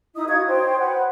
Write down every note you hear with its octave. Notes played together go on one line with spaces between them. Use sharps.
D#4 E4 D#5 D#6
F#4 B4 F5 G#6
C5 C#5 G5
B4 F#5